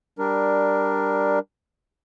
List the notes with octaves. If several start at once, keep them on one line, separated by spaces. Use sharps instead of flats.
G3 D4 A#4